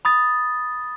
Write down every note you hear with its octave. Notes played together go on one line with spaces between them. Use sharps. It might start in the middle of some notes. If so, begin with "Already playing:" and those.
B5 D#6 A6